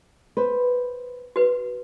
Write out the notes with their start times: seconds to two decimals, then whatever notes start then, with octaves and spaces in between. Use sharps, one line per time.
0.37 B4 C5
1.36 F#4 B4